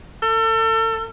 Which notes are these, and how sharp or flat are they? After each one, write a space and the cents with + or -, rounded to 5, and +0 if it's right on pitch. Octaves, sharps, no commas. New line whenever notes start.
A4 +35